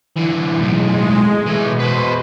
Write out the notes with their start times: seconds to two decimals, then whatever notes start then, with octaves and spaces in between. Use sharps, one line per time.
0.17 D3 E3
0.60 B1 A2 G#3
1.46 B2 E3 A3
1.79 B4 C5